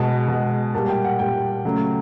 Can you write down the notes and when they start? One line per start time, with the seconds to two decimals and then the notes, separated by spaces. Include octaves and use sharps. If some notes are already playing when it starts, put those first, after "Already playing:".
Already playing: B2 G#3 A5
0.28 B2 G#3
0.74 A#2 G3 A5
0.88 G5
1.04 F#5
1.19 A#2 G3 G5
1.65 C#3 F#3 A3